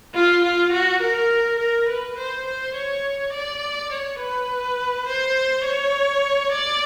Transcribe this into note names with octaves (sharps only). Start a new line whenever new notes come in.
F4
F4
F#4
A#4
A#4
B4
C5
C5
C#5
D5
C#5
B4
C5
C#5
D5